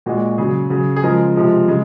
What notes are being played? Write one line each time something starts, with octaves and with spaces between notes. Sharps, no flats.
A#2 G#3 F#4
C#3 F#3 G#4
C#3 F#3
G#4
C#3 F3 G#3 A#4
C3 F3 G#3
C#3 G#3